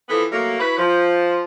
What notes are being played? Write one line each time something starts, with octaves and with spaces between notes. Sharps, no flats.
E3 F3 B3 A4
F#3 A3 A#3
E4 F#4 B4
F3